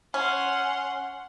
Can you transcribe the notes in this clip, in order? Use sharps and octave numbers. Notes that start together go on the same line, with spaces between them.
C#4 F#5 C6